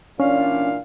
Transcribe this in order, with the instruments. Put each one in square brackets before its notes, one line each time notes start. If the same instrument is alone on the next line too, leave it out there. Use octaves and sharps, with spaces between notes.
[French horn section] A#2 E3 D4 [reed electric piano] C#4 [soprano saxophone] F5